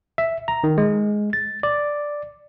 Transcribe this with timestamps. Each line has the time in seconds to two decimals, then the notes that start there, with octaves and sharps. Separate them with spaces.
0.18 E5
0.48 A#5
0.64 D#3
0.78 G#3
1.33 A6
1.63 D5